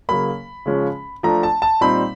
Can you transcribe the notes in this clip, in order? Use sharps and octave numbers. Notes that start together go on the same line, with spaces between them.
C#3 F#3 A#3 B5
C#3 F3 G#3 C#4
F3 A3 D4 A#5
A5
A5
A#2 G3 C4 D#4 B5